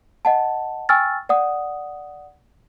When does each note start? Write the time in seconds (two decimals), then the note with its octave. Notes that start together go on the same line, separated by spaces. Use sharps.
0.25 D#5 F#5 A5
0.89 G5 G#5 C#6 E6 F6 A6
1.29 D5 F#5 D#6